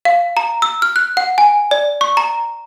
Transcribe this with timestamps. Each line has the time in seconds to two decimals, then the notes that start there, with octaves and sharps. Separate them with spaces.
0.05 F5
0.37 A#5
0.62 E6
0.82 F6
0.96 F#6
1.17 F#5
1.38 G#5
1.71 D5
2.01 C#6
2.17 A#5